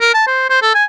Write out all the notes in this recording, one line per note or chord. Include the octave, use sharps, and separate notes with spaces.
A#4
A5
C5
C5
A4
G#5